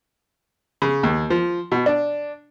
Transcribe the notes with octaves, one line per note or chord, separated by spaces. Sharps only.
C#3
D#2
F3
B2
D4